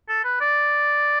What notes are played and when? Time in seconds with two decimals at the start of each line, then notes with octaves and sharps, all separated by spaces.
0.08 A4
0.24 B4
0.41 D5